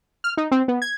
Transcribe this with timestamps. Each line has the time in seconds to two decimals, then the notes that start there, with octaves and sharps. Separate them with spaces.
0.24 F6
0.37 D#4
0.51 C4
0.68 B3
0.82 G#6